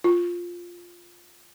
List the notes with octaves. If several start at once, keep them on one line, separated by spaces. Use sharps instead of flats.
F4